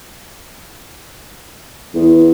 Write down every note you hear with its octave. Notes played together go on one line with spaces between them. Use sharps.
E2